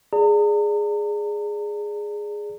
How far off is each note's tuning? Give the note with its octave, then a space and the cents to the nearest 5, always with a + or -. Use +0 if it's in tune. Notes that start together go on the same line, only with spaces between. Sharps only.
G#4 +0 D5 +0 A#5 -45